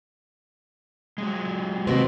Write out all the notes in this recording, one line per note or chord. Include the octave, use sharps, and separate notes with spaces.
F#3 G#3
C3 D#3 A#3 C4 F#4 B4 D#5